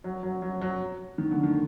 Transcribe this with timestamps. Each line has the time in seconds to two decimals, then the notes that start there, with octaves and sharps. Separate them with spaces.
0.04 F#3
0.23 F#3
0.42 F#3
0.61 F#3
1.18 D#3
1.31 D3
1.43 D#3